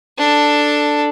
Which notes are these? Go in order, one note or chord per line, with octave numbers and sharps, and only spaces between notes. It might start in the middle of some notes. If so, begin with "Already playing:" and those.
D4 A4